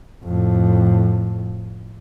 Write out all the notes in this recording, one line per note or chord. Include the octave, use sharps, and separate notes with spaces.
F2 A2